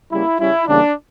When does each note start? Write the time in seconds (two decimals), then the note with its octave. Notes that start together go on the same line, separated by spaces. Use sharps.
0.11 C#3 G3 A#3 C#4 E4
0.39 C#3 G3 C#4 E4
0.67 E2 C#3 E3 G3 A#3 D4